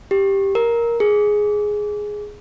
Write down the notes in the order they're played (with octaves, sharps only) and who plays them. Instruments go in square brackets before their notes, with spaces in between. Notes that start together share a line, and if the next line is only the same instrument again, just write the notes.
[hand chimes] G4
A#4
G#4